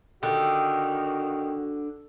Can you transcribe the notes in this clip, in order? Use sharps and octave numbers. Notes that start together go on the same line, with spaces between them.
D3 D#3 F#4 G4